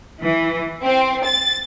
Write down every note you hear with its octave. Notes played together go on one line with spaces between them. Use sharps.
E3
C4
A6